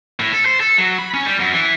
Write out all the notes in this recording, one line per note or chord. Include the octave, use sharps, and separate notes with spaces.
A2
A4
C5
A4
F#3
B5
C#4
G3
F#2
E3